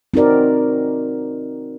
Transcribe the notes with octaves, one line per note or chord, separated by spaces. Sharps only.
C4 D#4 F#4 A#4 D5